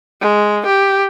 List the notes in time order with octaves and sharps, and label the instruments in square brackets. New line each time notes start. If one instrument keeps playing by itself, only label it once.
[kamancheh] G#3
G4